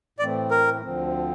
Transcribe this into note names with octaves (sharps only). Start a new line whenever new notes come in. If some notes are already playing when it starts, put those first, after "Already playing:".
A2 E3 A3 C4 D5
A#4
D2 D3 F3 C4